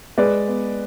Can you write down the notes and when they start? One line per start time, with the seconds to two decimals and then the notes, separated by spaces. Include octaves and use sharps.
0.18 G#3 B4 D5
0.47 B3